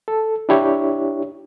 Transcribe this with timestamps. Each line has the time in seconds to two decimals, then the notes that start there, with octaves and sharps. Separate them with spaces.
0.08 A4
0.49 D4 E4 G4 C#5